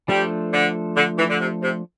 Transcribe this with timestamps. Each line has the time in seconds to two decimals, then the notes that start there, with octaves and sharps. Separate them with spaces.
0.08 F3 G3 A3 D4 A4 C5
0.53 D3
0.96 D3
1.18 E3
1.29 D3
1.40 C3
1.63 C3